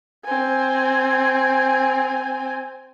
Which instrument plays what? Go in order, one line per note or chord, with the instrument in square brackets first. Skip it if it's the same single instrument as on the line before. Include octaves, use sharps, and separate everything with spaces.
[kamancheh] C4 G#5